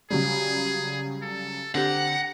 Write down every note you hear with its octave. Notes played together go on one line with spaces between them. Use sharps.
C#3 F#3 G3 G#4
A4
D3 C4 G4 F#5 A#5